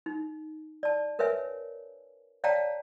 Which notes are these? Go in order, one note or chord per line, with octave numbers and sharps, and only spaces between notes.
D#4
D5 A5
A#4 B4 C#5 E5 G#5
C#5 D5 F5 G5 A5 A#5